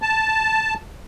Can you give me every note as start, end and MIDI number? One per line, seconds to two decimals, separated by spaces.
0.02 0.74 81